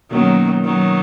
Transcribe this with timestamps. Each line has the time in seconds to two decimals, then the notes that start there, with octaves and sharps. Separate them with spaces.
0.10 B2 D#3 F#3 A#3 C#4
0.64 D#3 F#3